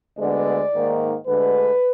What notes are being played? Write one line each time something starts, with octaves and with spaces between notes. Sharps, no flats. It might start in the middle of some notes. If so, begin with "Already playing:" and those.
D2 D3 G#3 B3 D5
G#2 D#3 A#3
D2 D3 G#3 B4